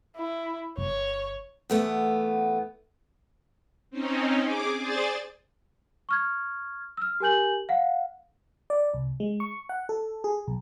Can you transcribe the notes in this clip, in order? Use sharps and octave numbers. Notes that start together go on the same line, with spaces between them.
E4
G1 C#5
E2 A3 B3
C4 C#4 D#4
G#4 D6
G#4 C5 D5 A6
C#6 F6 G#6
E6 F6
G4 A#4 G#5 G6 F#7
F5 F#5
D5
C2
G#3
C#6
F#5
A4
G#4
B1